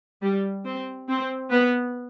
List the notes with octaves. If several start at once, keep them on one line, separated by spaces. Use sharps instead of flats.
G3
C4
C4
B3